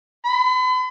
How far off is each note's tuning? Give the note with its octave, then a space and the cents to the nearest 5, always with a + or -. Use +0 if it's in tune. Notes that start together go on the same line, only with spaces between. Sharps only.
B5 +45